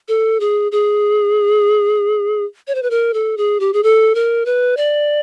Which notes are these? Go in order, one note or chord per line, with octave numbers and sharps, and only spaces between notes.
A4
G#4
G#4
C#5
C5
B4
A#4
A4
G#4
G4
G#4
A4
A#4
B4
D5